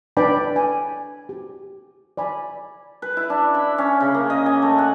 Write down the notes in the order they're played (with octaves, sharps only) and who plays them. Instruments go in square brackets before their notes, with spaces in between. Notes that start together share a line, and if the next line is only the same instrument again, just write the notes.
[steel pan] D4 B4 D5 G5 B5
G#5
G4
D5 G#5 B5
[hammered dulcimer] B4
E4
D4
B5
C#4
C#3
A#3
D#5
G#5
A3
F#5